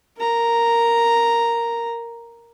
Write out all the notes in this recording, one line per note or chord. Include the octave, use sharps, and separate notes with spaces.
A#4 A#5